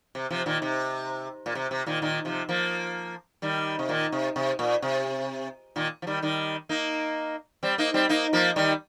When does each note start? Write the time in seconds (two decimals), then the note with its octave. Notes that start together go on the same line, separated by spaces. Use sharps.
0.15 C3
0.30 C3 F3
0.46 A#2 D#3
0.62 C3
1.46 A#2
1.55 C3
1.71 C3
1.86 A#2 D#3
2.02 A#2 D#3
2.25 C3 F3
2.49 F3 A#3
3.42 D#3 G3
3.79 C3
3.89 A#2 D#3
4.12 C3
4.36 C3
4.59 A#2
4.82 C3
5.76 A#2 D#3
6.02 F3
6.07 D#3 G3
6.22 D#3 G3
6.69 A#3 D#4
7.63 G3 C4
7.78 A#3 D#4
7.94 G3 C4
8.09 A#3 D#4
8.33 F3 A#3
8.56 D#3 G3